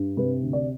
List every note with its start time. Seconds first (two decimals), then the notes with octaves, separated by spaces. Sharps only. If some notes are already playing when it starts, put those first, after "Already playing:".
Already playing: G2
0.17 C3 B4
0.42 D2
0.53 D5